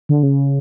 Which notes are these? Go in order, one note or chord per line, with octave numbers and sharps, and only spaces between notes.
D3
C#3